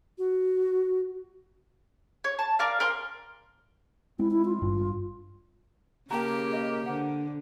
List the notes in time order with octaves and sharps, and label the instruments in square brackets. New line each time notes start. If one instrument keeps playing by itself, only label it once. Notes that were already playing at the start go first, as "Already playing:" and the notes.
[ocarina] F#4
[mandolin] C#5
A5
A#4 D5 F5
A#4 C5 C6 F6
[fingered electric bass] G#3 C4 [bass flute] E4
[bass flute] E4
F4
[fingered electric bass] G#1 G2
[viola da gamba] C#3 [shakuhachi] A#3 [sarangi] G4 [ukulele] G5 A5 A#5
[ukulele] G#4 B4 D#5
[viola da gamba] D3 [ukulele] C5 F#5